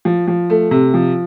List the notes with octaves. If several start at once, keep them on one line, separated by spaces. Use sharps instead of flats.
F3
F3
A3
C3
F3